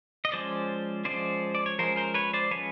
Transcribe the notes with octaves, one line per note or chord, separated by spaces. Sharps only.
D#5
F3 G#3 C#4 C5 D5
F3 G#3 C#4 C5 D5
D5
C#5
F3 G#3 C#4 A#4 C5
A#4 C5
B4 C#5
C5 D5
F3 G#3 C#4 B4 C#5